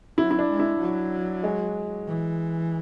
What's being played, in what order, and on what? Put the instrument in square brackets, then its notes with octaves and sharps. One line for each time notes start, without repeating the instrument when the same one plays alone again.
[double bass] F#3 [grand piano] E4
[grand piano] E4
D4
[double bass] G#3
[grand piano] E4
[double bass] F#3
[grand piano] G#3
[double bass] E3